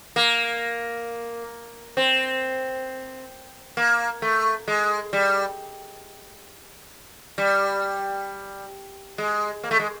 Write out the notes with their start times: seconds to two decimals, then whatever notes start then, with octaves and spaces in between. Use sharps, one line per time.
0.16 A#3
1.97 C4
3.77 A#3
4.22 A3
4.68 G#3
5.13 G3
7.38 G3
9.18 G#3
9.63 A#3
9.71 A3
9.80 G#3